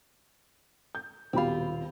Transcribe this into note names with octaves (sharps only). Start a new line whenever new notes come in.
G6
D#1 B2 C4 F4 G4 B5